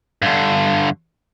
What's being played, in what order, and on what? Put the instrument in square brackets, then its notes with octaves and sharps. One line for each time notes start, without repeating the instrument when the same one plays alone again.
[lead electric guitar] G2 D3